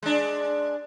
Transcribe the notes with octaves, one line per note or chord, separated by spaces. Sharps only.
G#3 D4